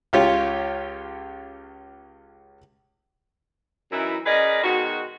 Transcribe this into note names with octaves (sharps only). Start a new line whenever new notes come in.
C#2 F4 G4 C#5
F#2 E3 D#4 E4
C#4 G#4 A#4 B4 D5 D#5
B2 D#3 G#3 F#4